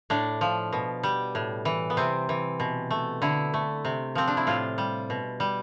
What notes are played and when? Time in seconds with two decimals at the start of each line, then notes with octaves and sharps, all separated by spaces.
0.10 A2 D4
0.41 F3
0.73 B2
1.03 G3
1.35 A2
1.65 E3
1.90 B3
1.97 C3 C4
2.29 E3
2.60 B2
2.90 A3
3.22 D3 E4
3.54 A3
3.85 C3
4.15 F3 C4
4.28 D4
4.37 E4
4.47 A2 F4
4.78 G3
5.10 B2
5.40 G3